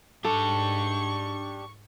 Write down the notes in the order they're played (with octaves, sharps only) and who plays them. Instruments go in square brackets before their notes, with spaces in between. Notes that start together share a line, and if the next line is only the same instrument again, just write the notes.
[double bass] G#2 [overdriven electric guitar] D4 G4 [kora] A4 [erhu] C#6